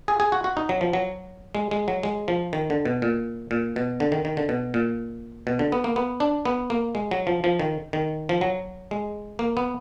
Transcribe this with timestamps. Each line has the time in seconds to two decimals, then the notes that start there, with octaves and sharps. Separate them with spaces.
0.08 G#4
0.20 G#4
0.32 F#4
0.44 F#4
0.57 D#4
0.69 F#3
0.81 F3
0.93 F#3
1.55 G#3
1.71 G#3
1.88 F#3
2.03 G#3
2.28 F3
2.53 D#3
2.70 D3
2.85 B2
3.02 A#2
3.51 A#2
3.76 B2
4.00 D3
4.12 D#3
4.25 D#3
4.37 D3
4.49 B2
4.74 A#2
5.47 B2
5.59 D3
5.72 B3
5.84 A#3
5.96 B3
6.20 D4
6.45 B3
6.70 A#3
6.95 G#3
7.11 F#3
7.27 F3
7.44 F3
7.59 D#3
7.93 D#3
8.29 F3
8.41 F#3
8.91 G#3
9.39 A#3
9.57 B3